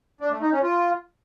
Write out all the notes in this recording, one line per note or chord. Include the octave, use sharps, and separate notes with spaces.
D4
A3
D#4
C#4
F4